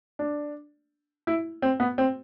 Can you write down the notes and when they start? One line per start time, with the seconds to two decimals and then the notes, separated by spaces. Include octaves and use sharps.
0.19 D4
1.27 E4
1.62 C4
1.80 B3
1.98 C4